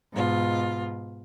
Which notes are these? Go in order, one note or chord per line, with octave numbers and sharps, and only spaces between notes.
G#2 B2 F4